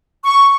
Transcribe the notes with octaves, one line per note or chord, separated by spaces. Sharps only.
C#6